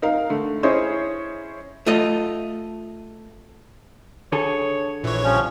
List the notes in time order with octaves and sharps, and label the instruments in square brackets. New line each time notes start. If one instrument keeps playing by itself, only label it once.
[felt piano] D#4 A#4 F5
D3 A3
C#4 E4 G#4 C5 C#5 D#5
[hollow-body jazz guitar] A3 F4 D#5
[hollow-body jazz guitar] D3 G#4 A4 [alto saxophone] C#5
[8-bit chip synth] A#1 C#5 [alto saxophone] E3
[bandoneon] F3 C#4 [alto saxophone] G3